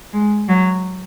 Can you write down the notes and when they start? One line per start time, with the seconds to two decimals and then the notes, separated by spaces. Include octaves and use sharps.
0.13 G#3
0.49 F#3